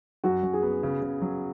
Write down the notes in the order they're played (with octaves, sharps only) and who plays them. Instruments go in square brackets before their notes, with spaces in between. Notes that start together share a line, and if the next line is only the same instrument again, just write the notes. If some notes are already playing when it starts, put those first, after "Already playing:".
[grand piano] F#2 [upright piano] F#4
[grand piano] F#2
[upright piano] G#4
[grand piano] B3
C#3
C#3
F#3